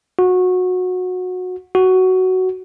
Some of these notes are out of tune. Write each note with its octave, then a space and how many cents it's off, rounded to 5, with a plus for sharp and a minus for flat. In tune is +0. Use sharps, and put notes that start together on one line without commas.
F#4 -20
F#4 +10